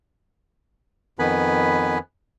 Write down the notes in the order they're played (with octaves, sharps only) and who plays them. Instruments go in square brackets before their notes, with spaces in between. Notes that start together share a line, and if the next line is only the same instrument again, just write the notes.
[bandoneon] F2 D#3 B3 B4 G#5 B5